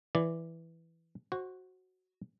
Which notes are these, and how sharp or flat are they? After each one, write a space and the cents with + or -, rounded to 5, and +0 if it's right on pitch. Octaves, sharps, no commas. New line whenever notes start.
E3 +0 D5 +0
F#4 +0 C5 +30